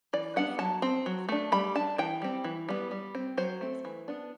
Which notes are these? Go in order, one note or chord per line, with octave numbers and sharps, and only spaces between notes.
E3 D5
G3 B3 D4 F#5
F#3 A5
C4
F#3
A3 D4
G3 B5
D4 A5
E3 G5
G3 C4
E3
G3 B3
G3
C4
F#3 C5
A3 C4
E3
B3 D4